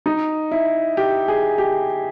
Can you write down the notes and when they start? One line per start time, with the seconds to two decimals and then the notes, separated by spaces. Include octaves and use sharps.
0.06 D#4
0.51 E4
0.97 G4
1.28 G#4
1.58 G4